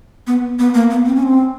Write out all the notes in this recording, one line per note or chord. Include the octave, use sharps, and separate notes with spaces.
B3
B3
A#3
B3
C4
C#4
C4